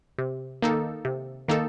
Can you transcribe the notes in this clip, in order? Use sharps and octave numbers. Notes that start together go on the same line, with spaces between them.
C3
D#3 A#3 D#4 A4
C3
D#3 A#3 D#4 A4